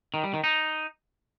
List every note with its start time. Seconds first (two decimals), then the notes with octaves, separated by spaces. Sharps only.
0.14 D#3
0.24 G3
0.34 D#3
0.44 D#4